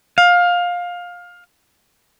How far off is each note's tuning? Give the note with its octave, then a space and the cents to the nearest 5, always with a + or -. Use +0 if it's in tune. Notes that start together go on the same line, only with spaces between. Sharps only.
F5 +20